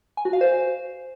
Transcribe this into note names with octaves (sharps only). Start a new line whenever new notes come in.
G#5
F#4
F5
C5